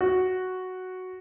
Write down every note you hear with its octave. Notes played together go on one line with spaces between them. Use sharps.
F#4